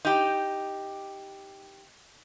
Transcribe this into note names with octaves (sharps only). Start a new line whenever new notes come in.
D#4 G4